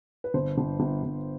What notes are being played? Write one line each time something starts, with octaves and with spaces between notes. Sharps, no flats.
B4
G1 C5
G1
G1
G1